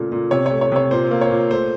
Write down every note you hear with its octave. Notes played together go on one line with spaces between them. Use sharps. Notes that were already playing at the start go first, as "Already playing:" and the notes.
Already playing: A#2 C#3 A3
A#2
C3 C#5
A3 C#5
C#5
C3 C#5
A#2 C5
A#3
C#5
A#2
A3 C5